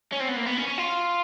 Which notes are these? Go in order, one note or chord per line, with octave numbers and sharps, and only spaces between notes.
C#4
C4
B3
A#3
B3
C#4
C#4
F4